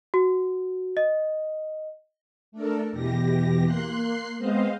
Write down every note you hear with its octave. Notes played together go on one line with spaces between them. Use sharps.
F#4
D#5
A3 D4 A4 A#4
E2 B2 E3 G4 A#6
A#3 C6 F#6 C7
G#3 B3 C4 C5 D#5 F5